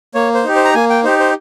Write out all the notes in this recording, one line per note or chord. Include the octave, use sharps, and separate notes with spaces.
A#3 C#5
C5
D#4 G4
C5
A#5
A#3 G#5
G5
D#4 G4 C5
C5